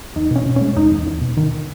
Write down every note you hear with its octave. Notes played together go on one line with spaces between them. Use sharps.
E2 D#4
B2 C#4
B2
G#3 C#4
E2 D#4
E2
E2
B2
D#3